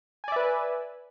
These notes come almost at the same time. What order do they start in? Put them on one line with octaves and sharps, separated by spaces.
G#5 D5 E5 B4